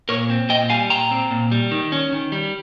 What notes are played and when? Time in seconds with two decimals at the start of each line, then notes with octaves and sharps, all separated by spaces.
0.09 A#2 A#4 C#5
0.30 C4
0.49 A#2 D#5 G5
0.70 G3 F5 G#5
0.90 A#2 G5 A#5
1.11 C4
1.31 A#2
1.51 G3
1.71 D#3
1.92 C#4
2.12 D#3
2.32 G3